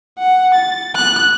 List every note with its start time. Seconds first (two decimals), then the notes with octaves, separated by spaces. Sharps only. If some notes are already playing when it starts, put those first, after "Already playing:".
0.18 F#5
0.55 A6
0.95 F#6